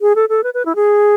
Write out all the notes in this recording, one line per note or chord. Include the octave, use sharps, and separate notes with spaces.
G#4
A4
A4
B4
B4
E4
G#4